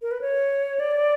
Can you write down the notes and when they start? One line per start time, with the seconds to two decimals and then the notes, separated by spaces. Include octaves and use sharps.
0.02 A#4
0.11 B4
0.21 C#5
0.80 D5